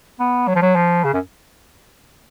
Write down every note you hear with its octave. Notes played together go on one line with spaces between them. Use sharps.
B3
F#3
F3
F#3
F3
C#3
F#2